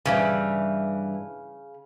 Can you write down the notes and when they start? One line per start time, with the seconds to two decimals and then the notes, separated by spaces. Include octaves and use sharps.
0.05 G2 C#3 E3 G3